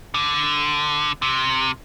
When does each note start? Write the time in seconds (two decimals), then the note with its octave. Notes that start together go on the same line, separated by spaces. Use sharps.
0.14 D3
1.22 C3